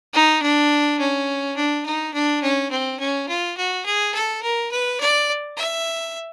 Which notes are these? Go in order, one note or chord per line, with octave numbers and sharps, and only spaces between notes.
D#4
D4
C#4
D4
D#4
D4
C#4
C4
C#4
F4
F#4
G#4
A4
A#4
B4
D5
E5